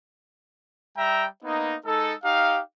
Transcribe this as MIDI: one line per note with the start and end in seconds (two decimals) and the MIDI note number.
0.97 1.26 55
0.97 1.26 76
0.97 1.26 79
0.97 1.26 82
1.44 1.76 58
1.44 1.76 59
1.44 1.76 63
1.86 2.14 56
1.86 2.14 63
1.86 2.14 69
2.24 2.60 63
2.24 2.60 67
2.24 2.60 77